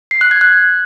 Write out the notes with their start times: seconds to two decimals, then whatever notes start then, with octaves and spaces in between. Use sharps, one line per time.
0.11 C7
0.21 F#6
0.31 G#6
0.41 F#6